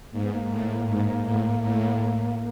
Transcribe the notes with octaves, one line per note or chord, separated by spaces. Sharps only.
G#2 A#3
B3
A#3
A2
G#2
A2
A2